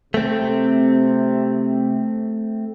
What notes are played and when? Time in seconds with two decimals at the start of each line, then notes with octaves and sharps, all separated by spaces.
0.14 C3 A3 C4